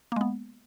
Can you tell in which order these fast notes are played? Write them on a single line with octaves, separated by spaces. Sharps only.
A#3 G#3 B3